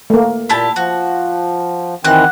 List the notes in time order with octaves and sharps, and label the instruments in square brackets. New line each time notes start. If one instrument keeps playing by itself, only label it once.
[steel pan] A3 A#3
[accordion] A#2 [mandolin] E4 G4 A5
[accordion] F3 [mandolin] F#4
[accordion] D#3 E3 C4 [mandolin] A#3 F#4 F#6